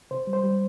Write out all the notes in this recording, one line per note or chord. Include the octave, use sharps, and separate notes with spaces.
C3 C5
G3
C5
G3